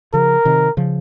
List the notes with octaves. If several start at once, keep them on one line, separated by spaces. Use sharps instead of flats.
C#3 F3 A#4
C3 D#3
C#3 F3